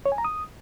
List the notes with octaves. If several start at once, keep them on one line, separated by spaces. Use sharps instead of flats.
C#5
G#5
A#5
D#6